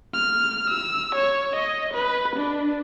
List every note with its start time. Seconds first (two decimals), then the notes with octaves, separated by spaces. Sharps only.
0.14 F6
0.70 E6
1.15 C#5
1.56 D#5
1.94 B4
2.36 D4